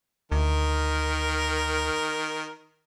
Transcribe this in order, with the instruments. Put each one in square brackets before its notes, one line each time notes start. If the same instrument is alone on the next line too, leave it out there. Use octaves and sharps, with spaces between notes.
[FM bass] D2 [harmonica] D#3 A#4